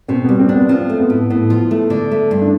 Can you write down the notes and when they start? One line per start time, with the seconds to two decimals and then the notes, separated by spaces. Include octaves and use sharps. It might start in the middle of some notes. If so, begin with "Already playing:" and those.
0.08 B2 C4
0.24 B3
0.29 G3
0.39 C4
0.49 D4
0.54 B3
0.69 F3 C4
0.90 A3
0.99 B3
1.10 A2
1.30 A2 B3
1.50 F3
1.71 A3
1.90 D3
2.11 A3
2.31 G2
2.42 D4